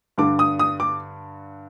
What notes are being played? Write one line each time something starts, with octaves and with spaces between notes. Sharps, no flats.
G2 D3 D6
D#6
D#6
D6